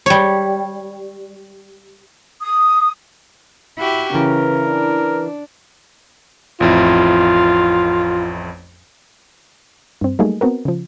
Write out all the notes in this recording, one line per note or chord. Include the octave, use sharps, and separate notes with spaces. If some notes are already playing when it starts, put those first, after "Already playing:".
G3 C#5
D#6
E4 F#4 G4
C#3 E3 A#4
D4
A1 F2 E4 F4
G2 C4
F#3 G3 A3 A#3 D#4 G#4
B3 C4 F#4 A#4
C#3 F3